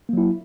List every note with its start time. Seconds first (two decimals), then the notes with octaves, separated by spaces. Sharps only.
0.09 A#3
0.13 F#3
0.18 E4